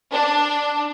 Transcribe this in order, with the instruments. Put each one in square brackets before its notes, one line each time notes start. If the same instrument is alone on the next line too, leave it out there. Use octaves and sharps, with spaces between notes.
[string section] D4